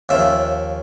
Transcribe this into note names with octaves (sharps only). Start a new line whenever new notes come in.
D#2 C#3 F3 E5